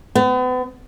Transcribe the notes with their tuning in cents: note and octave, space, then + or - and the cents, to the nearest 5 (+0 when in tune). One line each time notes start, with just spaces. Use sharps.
B3 +40